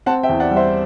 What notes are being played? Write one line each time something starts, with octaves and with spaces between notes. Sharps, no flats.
C4 F#5 A5
E5 G5
E2
D5 F#5
G3
C5 E5